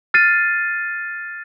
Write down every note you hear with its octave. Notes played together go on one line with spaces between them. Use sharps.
F6 A6 C7 D#7